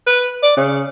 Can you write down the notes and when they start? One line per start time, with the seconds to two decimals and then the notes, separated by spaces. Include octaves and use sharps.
0.06 B4
0.42 D5
0.57 C#3